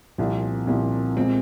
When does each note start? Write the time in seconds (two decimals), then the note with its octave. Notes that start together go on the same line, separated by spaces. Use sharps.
0.18 C2 A#2 F3
0.67 C2 A#2 F3
1.17 A#2 G#3 C4